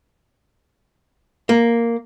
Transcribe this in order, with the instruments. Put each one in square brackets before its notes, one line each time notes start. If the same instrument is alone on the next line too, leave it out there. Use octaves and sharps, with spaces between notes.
[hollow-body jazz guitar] A#3